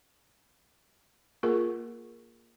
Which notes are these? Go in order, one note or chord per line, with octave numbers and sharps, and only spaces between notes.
A#3 F4 G#4 A#4